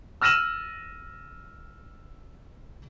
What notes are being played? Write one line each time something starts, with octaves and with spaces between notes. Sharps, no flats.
E6 F6 A#6 D#7 E7 F#7